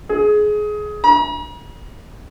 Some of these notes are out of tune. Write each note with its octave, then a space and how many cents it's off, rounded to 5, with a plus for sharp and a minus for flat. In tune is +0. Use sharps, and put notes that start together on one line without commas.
G#4 +20
A#5 +45